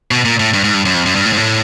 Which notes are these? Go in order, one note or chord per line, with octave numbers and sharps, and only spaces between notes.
B2
A#2
A2
G2
G#2
G2
F#2
F2
F#2
G2
A2
G#2
A2